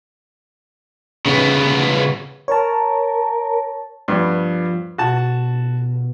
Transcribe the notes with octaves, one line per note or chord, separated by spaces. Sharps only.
C#3 B3
A#4 C#5 A5
G2 F3 B3
B2 F#4 A5